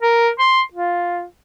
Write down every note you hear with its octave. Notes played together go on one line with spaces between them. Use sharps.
A#4
C6
F4